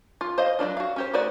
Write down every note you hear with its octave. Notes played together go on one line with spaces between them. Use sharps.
F4
C5 D#5 F5
F#3 G#3 D4 F4
F#4 F5
C#4 G4 C5
A3 D#4 F#4 C5 D5